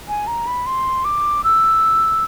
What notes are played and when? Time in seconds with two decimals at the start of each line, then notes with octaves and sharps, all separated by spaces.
0.08 G#5
0.27 A#5
0.47 B5
0.66 C6
1.05 D6
1.44 E6